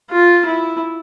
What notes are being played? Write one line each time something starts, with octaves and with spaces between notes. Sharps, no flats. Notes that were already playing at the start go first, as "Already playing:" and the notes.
F4
E4